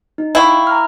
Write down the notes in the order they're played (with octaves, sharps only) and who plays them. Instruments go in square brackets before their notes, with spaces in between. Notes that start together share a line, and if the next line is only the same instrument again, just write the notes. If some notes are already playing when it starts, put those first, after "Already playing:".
[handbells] D#4
[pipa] E4 [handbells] F5 G5 C#6
[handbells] A#5 F6